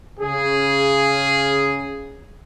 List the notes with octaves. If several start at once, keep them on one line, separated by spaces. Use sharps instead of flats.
C#3 G#4